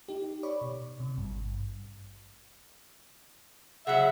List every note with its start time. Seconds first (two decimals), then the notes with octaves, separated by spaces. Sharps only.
0.08 D#4 G4
0.43 C#5 D5 B5 C#6 D6
0.61 B2
1.00 C3
1.17 G#1 G2
3.87 C#3 F#3 E5 F#5